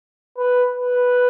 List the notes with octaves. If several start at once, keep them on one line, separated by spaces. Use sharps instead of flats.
B4
B4